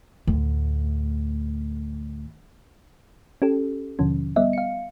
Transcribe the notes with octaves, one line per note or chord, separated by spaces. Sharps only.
D2 A2
C#4 G4 A4
D#2 B2 D3 F3 C#4
G3 B3 D#5 E5
F5 C#7